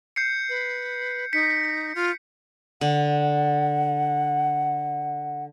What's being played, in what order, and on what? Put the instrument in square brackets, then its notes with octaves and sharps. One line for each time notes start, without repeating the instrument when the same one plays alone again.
[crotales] G6 C7 C#7
[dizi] B4
[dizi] D#4 [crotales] B6 C#7
[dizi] F4
[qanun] D3 [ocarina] F#5